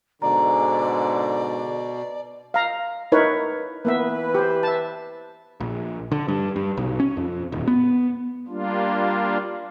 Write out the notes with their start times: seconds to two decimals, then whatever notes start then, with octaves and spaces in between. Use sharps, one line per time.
0.22 G#2 B2 D3 D5 A#5
2.54 F5 A#5
3.12 D#4 E4 A#4 B4 C#5
3.85 E3 A#3 B3 B4 E5
4.35 G4 C5
4.63 E5 A5
5.60 A#1
6.12 D3
6.28 G2
6.56 G2
6.77 B1
7.00 C#4
7.17 F2
7.52 D#1
7.68 B3
8.48 G3 A#3 D4 F4